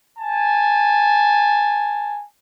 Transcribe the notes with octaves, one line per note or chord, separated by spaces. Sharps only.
G#5 A5